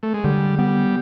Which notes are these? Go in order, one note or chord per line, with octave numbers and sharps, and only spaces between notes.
A3
G#3
D3 G3
G3 B3